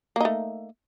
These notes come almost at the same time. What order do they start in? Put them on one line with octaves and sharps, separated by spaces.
A#3 D#4 A3